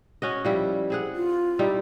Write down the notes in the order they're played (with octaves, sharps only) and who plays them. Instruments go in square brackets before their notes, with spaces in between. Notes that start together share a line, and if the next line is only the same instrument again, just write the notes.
[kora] C#4 F#4 D#5
F3 G3 E4
C4 G#4 F#5
[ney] F4
[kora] G3 D#4 E4